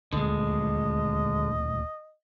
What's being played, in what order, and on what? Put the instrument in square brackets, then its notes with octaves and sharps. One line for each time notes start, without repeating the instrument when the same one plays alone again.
[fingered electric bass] D#1 D2 A3 [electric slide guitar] D3 G#3 [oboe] D#5